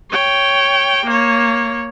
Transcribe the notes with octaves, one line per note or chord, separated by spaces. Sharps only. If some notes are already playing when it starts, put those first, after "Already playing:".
C#5 G5
A#3 C#5